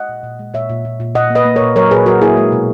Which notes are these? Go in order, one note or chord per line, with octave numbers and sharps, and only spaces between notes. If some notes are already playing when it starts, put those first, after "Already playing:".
Already playing: G#3 D#5 F#5
A#2
A#2
G#3
A#2 C#5 E5
A#2
A#2
A#2
A#2 D#5 F#5
A#3
B4 D#5
A#3
A#4 C#5
A#2
F#3 A#4 C#5
A#2 G#4 B4
F#3 F#4 A#4
A#3 E4 G#4
G#3
B2